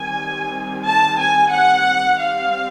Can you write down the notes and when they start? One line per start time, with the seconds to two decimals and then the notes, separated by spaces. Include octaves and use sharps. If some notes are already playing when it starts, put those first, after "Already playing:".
Already playing: D#3 G3 C4 G#5
0.86 A5
1.20 G#5
1.52 F#5
2.18 G3 C4 F5